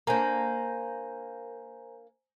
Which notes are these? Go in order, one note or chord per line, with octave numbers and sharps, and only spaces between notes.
A#3 D4 C5 G#5 A#5